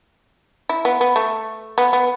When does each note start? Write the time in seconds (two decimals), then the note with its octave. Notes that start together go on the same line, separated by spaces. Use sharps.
0.69 E4
0.85 B3
1.01 B3
1.16 A3
1.78 B3
1.93 B3